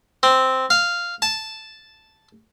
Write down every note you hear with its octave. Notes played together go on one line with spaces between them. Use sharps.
C4
F5
A5